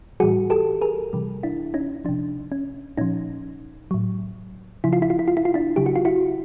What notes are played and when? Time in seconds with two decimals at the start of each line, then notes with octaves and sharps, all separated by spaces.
0.20 A2 E3 G3 F#4 G#4
0.50 G4 A4
0.81 G#4 A#4
1.13 C3 E3 G3
1.43 D4 E4
1.74 C#4 D#4
2.05 C3 F3 D4
2.52 C#4
2.98 A#2 F3 C#4 D#4
3.91 A2 F#3
4.84 C#3 F3 E4
4.93 F4
5.02 E4
5.10 F4
5.19 E4
5.28 F4
5.37 E4
5.45 F4
5.54 D4 E4
5.76 C#3 F#3 G4
5.86 F#4
5.96 F4
6.05 E4 F#4